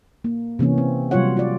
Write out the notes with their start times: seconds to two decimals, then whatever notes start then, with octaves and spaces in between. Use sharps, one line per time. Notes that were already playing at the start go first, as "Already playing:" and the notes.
0.24 A#3
0.59 C3 E3 A#3 C#4
0.78 C4
1.11 C3 F#3 G3 F4 C#5 F#5
1.37 F4 D5